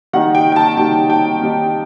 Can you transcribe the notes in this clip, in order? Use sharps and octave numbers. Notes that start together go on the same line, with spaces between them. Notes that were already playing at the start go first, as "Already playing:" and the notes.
D#3 G3 D#4 F#5
G5
G5
A5
D#3 G3 D#4 A5
G5
D#3 G3 D#4